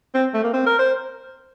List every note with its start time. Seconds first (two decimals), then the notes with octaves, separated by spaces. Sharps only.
0.14 C4
0.34 A3
0.44 A#3
0.53 C4
0.66 A#4
0.79 C5